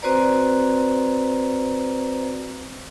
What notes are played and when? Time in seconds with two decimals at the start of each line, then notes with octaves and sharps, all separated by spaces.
0.02 C4 F#4 B4 C5 D5 A#5